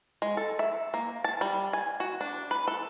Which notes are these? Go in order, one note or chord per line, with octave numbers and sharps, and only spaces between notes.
G#3
A4
E5
A#3
A5
G3
G#5
F#4
D4
B4
A4